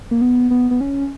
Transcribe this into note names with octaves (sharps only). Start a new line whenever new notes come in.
A#3
B3
B3
B3
C#4